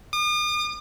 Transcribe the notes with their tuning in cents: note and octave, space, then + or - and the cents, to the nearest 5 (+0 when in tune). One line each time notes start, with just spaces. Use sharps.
D#6 -45